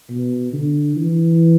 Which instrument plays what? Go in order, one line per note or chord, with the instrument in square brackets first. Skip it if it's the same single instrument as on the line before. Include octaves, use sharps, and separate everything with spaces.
[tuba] B2
D3
E3